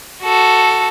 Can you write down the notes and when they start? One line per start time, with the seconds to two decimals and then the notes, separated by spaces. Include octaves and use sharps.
0.23 F#4 A4